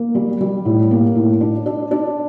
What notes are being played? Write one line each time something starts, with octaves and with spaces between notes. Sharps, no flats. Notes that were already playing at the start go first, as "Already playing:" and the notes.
Already playing: A#3
G3
G3
A2
A#3
A2
D4
D4
D4